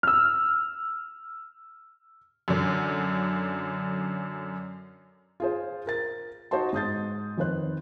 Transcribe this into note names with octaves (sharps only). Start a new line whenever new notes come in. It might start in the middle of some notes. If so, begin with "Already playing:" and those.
E6 F6
F#2 D3
F4 G#4 C5
A#4 A6
D#4 F#4 C5 D#5 A5 C6
G#2 D#6 G6 A6
F2 D#3 B4 C5 F#6